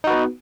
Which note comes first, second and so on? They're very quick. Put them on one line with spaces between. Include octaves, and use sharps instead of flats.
D#4 F#4 B4 B3